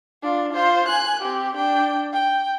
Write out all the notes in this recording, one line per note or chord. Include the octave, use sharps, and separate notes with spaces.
D4 F4
F4 C5
G#5 F#6
C4 G4
D4 G5
G5